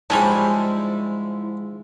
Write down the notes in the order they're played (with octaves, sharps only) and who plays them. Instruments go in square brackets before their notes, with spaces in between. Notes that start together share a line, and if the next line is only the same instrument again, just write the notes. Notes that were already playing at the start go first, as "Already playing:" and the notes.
[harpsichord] G#2 F3 G#3 [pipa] G3 C#4 D4 [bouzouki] E4